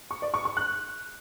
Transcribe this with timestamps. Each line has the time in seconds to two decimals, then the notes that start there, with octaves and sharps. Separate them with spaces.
0.11 C#6
0.22 D5
0.34 C#6
0.45 C#6
0.57 F#6